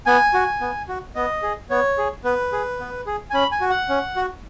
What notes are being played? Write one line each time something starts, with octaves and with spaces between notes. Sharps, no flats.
B3 G#5
F#4
B3
F#4
B3 D#5
G#4
B3 C#5
G#4
B3 B4
G#4
B3
G#4
G#5
C#4 B5
G#5
F#4
F#5
C#4
F#4